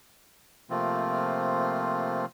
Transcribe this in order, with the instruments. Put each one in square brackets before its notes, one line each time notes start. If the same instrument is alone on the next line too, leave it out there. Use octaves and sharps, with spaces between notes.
[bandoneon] C3 F3 A3 A#3 C4 F4